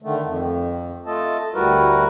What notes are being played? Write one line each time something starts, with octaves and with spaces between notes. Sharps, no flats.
D3 D#3 A3
F2
A3 F4 A4 D#5 A5
D2 G3 E4 F#4 A#4 B4